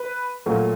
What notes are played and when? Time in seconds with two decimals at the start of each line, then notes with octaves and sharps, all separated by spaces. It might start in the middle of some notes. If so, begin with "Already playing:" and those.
Already playing: B4
0.46 A#2 F#3 A3